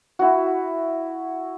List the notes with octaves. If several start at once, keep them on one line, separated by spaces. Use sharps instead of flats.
E4 F#4